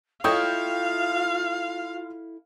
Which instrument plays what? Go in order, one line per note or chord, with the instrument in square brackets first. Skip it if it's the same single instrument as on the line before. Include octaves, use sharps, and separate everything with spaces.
[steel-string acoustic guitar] E4 A4 [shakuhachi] F4 [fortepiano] C#5 D#5 G5 [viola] F5